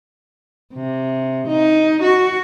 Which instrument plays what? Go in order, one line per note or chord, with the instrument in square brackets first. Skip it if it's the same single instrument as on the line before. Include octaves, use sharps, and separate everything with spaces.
[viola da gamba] C3
D#4
F#4